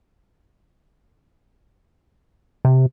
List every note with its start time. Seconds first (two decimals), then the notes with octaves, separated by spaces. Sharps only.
2.65 C3